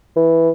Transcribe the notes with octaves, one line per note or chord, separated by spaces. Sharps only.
E3